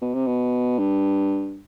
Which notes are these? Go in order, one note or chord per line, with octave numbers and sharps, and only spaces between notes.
B2
C3
B2
G2